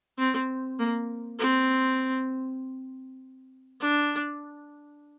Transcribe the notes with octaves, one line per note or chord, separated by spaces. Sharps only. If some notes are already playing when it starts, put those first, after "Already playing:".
C4
A#3
C4
D4